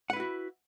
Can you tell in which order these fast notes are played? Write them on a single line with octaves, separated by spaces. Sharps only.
F#5 B4 E4 F#4